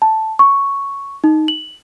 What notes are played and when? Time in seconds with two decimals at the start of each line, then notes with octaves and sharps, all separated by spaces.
0.02 A5
0.39 C#6
1.24 D#4
1.48 F#7